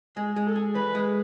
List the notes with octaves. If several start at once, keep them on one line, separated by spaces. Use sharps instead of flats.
G#3 G#4
G#3
A4
G#4
E3 B4
G#3